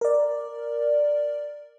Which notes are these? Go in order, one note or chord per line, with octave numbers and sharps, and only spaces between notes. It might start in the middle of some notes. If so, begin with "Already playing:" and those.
A#4 D5